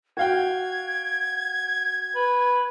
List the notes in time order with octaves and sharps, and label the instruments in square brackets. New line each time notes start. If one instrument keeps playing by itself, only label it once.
[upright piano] F#4 F5 G5 [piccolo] G#6
[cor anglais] B4